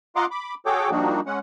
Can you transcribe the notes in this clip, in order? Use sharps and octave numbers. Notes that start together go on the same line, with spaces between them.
F4 D#5 F#5 A#5 C6 D6
B5 D6
F#4 G#4 A4 C#5 G5 D6
F3 G3 A#3 D4 D#4 F#4
G#3 C#4 F#5